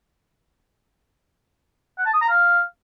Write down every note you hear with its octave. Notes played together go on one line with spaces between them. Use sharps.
F#5
A5
D#6
A#5
F5